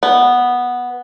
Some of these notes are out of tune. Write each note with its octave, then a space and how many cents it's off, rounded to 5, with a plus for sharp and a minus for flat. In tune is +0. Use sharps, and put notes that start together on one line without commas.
B3 -5